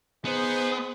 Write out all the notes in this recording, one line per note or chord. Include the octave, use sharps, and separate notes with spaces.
B3 D#4 G#4 C5